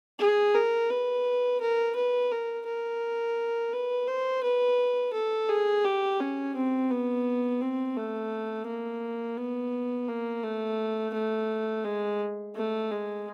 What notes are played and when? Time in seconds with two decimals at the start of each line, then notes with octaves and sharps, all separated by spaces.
0.19 G#4
0.55 A#4
0.89 B4
1.60 A#4
1.95 B4
2.31 A#4
2.66 A#4
3.73 B4
4.07 C5
4.43 B4
5.13 A4
5.49 G#4
5.84 G4
6.20 C#4
6.55 C4
6.90 B3
7.61 C4
7.96 A3
8.67 A#3
9.37 B3
10.08 A#3
10.43 A3
11.14 A3
11.84 G#3
12.55 A3
12.91 G#3